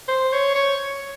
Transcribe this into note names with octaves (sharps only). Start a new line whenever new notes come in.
C5
C#5
C#5